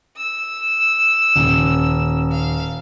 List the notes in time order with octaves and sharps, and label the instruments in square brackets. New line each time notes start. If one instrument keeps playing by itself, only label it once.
[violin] E6
[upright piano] D#1
[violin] F5